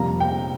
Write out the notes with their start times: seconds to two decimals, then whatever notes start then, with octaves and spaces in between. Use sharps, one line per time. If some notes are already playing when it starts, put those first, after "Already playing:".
Already playing: F2 C3 G3 A#3 A#5
0.20 G5